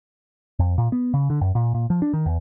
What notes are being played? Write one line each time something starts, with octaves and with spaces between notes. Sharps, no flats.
F2
A#2
B3
C#3
D3
F#2
A#2
A#2
F3
D4
D#3
E2